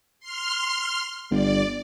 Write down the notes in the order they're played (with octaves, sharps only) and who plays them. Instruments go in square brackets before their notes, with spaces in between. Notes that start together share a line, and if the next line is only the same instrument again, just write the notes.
[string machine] C6 F6
[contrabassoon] G1 [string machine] D5